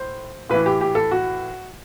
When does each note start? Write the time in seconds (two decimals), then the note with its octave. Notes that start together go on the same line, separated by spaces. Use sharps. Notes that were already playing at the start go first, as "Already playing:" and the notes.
Already playing: A2 C5
0.50 A2 E3 B4
0.66 G4
0.81 G4
0.95 A4
1.11 F#4